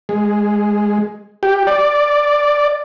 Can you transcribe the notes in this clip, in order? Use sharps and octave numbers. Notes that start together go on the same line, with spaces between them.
G#3
G4
D5